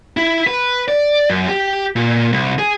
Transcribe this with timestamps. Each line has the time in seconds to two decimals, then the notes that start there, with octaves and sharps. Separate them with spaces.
0.17 E4
0.47 B4
0.88 D5
1.30 F#2
1.49 G4
1.96 A#2
2.32 C2
2.58 G#4